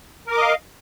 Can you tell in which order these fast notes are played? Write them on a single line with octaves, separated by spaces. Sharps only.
A#4 D6 D#5 F5